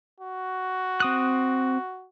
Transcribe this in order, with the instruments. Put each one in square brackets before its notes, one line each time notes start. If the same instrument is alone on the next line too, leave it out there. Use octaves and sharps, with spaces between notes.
[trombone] F#4
[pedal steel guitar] C4 D#6 F#6